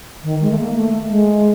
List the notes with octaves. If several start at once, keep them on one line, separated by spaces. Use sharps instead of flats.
D#3
G#3
A3
A#3
A3
G#3